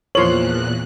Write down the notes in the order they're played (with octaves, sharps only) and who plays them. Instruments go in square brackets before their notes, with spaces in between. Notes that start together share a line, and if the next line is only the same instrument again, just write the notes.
[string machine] E2 A#2 F#6 [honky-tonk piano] F3 F#7 [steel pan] C#5 C6